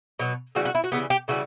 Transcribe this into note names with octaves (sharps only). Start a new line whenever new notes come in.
B2 F#3
C#3 E3 G3 F#4
F#4
E4
F#4
C#3 E3 G3 B3
G4
C#3 E3 G3 F#4